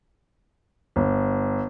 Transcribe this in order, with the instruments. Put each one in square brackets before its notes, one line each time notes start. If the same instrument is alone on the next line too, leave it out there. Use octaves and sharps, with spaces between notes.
[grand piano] G1